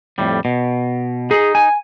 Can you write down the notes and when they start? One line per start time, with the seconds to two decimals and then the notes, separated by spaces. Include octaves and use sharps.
0.18 F2 A2 G3
0.45 B2
1.31 D#4 G#4
1.55 G#5